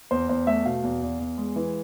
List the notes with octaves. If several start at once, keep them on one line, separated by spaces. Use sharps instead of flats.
E2 C5
E2 C5
A3 E5
B2 F5
E2
E2
E2
G#3
E3